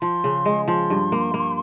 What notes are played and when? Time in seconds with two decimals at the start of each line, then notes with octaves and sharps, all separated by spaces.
0.01 F3 C6
0.24 C#3
0.46 G#3
0.68 F3 C6
0.90 G2
1.12 A#3
1.34 A#3